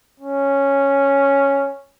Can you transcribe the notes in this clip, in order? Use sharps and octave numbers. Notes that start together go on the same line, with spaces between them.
C#4